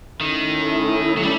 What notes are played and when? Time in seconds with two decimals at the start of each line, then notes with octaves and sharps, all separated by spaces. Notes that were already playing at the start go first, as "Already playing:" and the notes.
0.21 D#3 A3 C#4 E4
1.17 F#3
1.23 G3